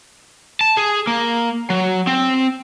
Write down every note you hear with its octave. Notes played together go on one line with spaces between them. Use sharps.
A5
G#4
A#3
F#3
C4